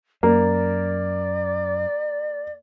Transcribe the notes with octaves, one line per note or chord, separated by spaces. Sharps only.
F#2 A#3 D5